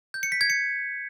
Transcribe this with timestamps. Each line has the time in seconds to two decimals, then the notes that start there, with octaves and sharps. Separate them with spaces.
0.14 G6
0.23 C#7
0.32 B6
0.41 G#6
0.50 C#7